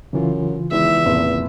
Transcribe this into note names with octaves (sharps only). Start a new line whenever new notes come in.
F#2 C#3 E3 F4
E2 D#3 G#3 E4 E5
F1 A#2 B3